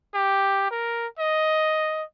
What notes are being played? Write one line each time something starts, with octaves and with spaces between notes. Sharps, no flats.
G4
A#4
D#5